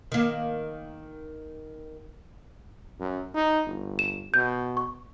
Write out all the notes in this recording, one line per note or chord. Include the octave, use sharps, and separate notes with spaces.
D#3 A#3
F#2
D#4
G1
E7
B2 G6
C#6